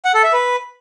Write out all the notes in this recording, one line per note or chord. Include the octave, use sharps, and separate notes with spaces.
F#5
A4
E5
B4